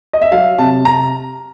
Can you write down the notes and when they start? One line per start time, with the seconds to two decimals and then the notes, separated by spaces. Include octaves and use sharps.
0.13 D#5
0.22 E5
0.31 F#3 F5
0.58 C3 A5
0.85 C3 A#5